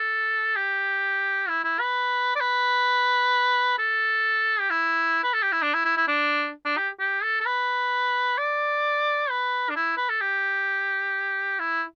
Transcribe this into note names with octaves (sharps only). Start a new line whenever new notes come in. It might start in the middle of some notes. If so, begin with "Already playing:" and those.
Already playing: A4
G4
E4
E4
B4
D5
B4
A4
G4
E4
B4
A4
G4
E4
D4
E4
E4
E4
D4
D4
G4
G4
A4
A4
B4
D5
B4
D4
E4
B4
A4
G4
E4